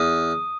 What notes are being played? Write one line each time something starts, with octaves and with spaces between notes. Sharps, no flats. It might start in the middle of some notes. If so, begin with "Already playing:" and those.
Already playing: E2 D#6